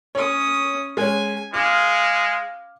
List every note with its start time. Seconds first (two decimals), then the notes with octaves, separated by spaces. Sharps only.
0.15 C#4 C#5 D#6
0.97 G#3 C#4 G#5
1.54 G#3 F5 D6 F6